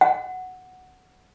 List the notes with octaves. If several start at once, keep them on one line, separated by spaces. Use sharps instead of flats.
F#5